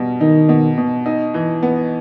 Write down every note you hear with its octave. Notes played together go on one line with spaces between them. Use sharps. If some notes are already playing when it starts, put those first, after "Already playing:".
Already playing: B2 G3
D#3 D#4
B2
B2
D#4
E3
B3